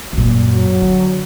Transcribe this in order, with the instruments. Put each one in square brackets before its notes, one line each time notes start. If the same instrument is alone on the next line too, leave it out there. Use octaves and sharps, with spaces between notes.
[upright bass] F#2 A#2
[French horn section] F#3
[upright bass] D3